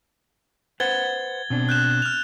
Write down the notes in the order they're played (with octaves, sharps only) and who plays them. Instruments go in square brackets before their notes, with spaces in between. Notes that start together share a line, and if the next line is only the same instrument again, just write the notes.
[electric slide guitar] B4 C5 F#5 [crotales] G#6 A6 G7
[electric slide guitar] B2 C4 D4
[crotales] F#6 G6 E7
F6 F#6 F7